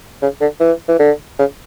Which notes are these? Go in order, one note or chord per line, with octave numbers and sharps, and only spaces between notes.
C#3
D3
E3
E3
D3
C#3